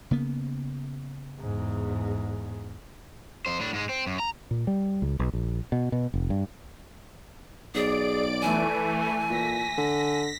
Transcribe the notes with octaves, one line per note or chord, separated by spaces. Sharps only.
C#3 A#3 B3
E2 G#2
F2 C5
A2 D4
G#2 G#3
C4
F#2
A#5
A#2
G3
C#2
B1
A#1
B2
B2
F1
G2
B1 G#4 D5 D7
E3 A3 G#5
A#2 A#6 B6
D3